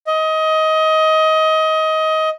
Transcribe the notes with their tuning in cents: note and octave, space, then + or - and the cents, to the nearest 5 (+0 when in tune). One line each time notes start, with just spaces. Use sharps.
D#5 +20